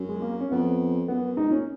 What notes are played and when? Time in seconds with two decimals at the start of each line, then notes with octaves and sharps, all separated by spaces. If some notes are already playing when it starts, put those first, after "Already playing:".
Already playing: F#2
0.09 G#3
0.22 A#3
0.40 C#4
0.51 F2 B3
1.08 F#2 B3
1.37 G#2 D#4
1.49 A#2 C#4